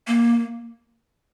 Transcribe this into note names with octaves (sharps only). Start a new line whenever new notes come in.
A#3